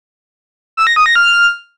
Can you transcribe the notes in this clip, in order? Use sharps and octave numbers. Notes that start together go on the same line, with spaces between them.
E6
A#6
D#6
A#6
F6